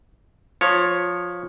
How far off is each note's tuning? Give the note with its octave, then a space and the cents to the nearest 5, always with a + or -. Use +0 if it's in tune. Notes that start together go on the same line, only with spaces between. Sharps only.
F3 +15 C#5 +0